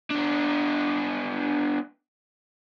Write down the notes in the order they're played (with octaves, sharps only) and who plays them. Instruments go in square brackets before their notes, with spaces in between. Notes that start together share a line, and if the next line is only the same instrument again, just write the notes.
[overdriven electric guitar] B3 D4